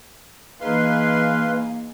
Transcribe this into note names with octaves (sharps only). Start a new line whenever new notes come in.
E3 A#3 D#4 G#4 B4 F5 C6